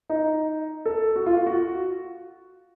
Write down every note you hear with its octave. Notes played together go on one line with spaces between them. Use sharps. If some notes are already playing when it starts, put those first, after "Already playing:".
D#4
A4
F#4
F4
F4
F#4